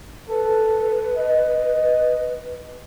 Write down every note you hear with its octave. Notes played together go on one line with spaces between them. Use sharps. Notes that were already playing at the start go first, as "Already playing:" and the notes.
A4 B4
D#5